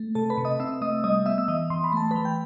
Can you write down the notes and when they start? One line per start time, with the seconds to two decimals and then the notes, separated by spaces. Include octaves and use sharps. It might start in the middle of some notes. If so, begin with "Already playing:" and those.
Already playing: A3
0.15 C3 A4 A5
0.30 B4 B5
0.38 C3
0.45 D#5 D#6
0.60 C4 E5 E6
0.82 A3 D#5 D#6
1.04 G3 D#5 D#6
1.26 B3 E5 E6
1.38 E6
1.48 E3 D#5 D#6
1.70 E3 C6
1.84 B5
1.93 A3 A5
2.11 E3 B4 B5
2.25 G5